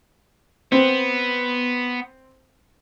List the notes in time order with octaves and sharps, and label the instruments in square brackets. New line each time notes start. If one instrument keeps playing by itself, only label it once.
[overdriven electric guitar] B3 [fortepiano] C4